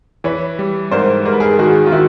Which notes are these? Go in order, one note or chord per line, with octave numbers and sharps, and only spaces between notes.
E3 B4 C#5
G3
G#2 A#4 C5
G#2 A#4
B4
G#4 A#4
D#3 F#4 G#4
F4
D#3 E4 F#4